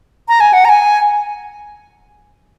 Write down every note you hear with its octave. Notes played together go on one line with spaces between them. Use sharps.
A#5
G#5
F#5
A#5
G#5